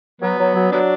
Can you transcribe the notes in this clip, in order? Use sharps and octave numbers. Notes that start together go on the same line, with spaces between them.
F#3 B3
F#3
F#3
F#3 B3 D4